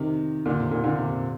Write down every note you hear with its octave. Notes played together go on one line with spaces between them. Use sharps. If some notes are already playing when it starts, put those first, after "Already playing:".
Already playing: C3 D#3
A#2 D3
C3
A#2 D3
A#2 D3
C3
C3